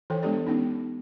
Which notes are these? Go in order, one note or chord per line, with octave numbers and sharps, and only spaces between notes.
E3 A4 C#5 G5
G#3 B3 D4 G4 A4 D5
B3 C#4 D#4